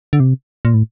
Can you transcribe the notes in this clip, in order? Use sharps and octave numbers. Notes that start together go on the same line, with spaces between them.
D3
C3
A#2
A2